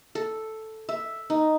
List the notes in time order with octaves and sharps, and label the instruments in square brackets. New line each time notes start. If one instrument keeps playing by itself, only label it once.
[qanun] A4
E5
D#4